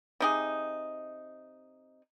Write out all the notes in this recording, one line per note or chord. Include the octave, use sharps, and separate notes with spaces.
C3 D#4 G#4